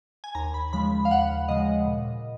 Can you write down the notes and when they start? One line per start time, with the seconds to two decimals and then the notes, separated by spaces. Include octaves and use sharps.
0.24 G#5
0.35 D#2 A#5
0.54 B5
0.73 C#3 F3 G#3 B5
1.05 F5
1.11 D#2 F#5
1.48 C#3 F3 G#3 D#5
1.87 A#2